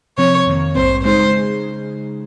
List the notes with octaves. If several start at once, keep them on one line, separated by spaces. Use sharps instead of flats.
C3 F3 C4 C#5
F2 D#3 A#3
A#1 G#2 G3 C4 C5
C#3 G#3 D#4 G#4 C5